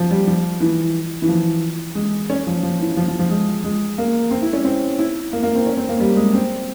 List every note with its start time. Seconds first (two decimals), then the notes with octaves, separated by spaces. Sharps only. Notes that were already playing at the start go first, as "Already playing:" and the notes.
Already playing: F3
0.11 G3
0.27 F3
0.61 E3
1.22 E3
1.28 F3
1.95 G#3
2.30 C#4
2.47 F3
2.63 F3
2.80 E3
2.97 F3
3.08 F3
3.19 F3
3.30 G#3
3.64 G#3
3.98 A#3
4.31 C4
4.42 E4
4.53 C#4
4.64 C4
4.99 E4
5.33 A#3
5.43 A#3
5.55 C4
5.66 C#4
5.77 C4
5.89 A#3
6.00 G3
6.16 G#3
6.34 C4